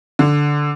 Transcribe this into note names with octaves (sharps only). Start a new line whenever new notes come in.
D3